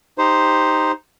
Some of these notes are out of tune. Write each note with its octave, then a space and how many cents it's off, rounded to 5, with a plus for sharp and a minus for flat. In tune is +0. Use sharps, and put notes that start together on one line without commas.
D#4 +0 G4 +0 C5 +0